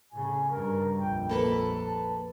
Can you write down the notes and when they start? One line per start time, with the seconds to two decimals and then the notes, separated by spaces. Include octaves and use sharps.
0.12 A2 C#3 G#5
0.50 G2 C#3 A#4
1.00 A#1 F2 G5
1.29 A#3 A4 B4 B5
1.76 A5